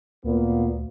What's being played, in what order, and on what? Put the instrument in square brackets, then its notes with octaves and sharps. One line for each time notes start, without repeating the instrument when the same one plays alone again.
[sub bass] D2 [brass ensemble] A#2 A#3 B3